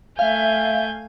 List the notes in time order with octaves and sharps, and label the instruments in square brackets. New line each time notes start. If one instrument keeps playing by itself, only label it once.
[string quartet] A3 G#5 G6 [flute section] E5 [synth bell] F5